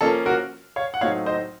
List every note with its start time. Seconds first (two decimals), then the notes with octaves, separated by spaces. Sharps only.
0.01 F3 A#3 C#4 A4
0.26 F#4 A#4
0.76 C#5 F5
0.94 F#5
1.01 A2 F#3 A3 C4 D#4 C#5 F5
1.26 C5 D#5